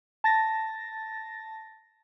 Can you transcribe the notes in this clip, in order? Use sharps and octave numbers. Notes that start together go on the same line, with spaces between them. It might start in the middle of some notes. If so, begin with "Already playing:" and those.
A5 A6 A#6